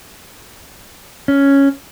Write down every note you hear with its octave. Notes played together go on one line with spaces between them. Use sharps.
C#4